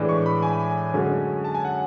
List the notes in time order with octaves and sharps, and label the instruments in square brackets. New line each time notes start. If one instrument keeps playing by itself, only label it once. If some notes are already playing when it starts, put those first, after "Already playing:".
Already playing: [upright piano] A2 E3 G#3 D4
C#6
B5
G#5
F#2 D3 G#3 C#4
A5
G#5
F#5